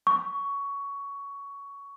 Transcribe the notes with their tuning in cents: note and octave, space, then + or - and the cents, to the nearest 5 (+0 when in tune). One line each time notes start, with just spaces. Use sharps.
C#6 +15